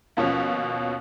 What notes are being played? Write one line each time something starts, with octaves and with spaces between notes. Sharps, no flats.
D#2 B2 F3 C#4